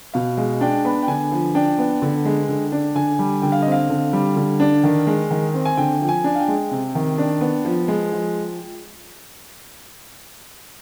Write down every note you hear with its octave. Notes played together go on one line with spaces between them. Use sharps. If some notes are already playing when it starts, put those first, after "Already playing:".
B2 F5
G#3 F5
D4 G5
B3 B5
G5
D3 G#5
F3
D4 G5
B3
D3
G#3
D3
D4
D3 G#5
G3
D3 G5
F5
C4 D#5
F5
D3
G3
D3
D4
D#3
G#3
D#3
C4
G#5
D3 G5
F3 G5
G#5
D4
F5
G5
G#3
C3
D#3
D4
B3
F3
G#3
F3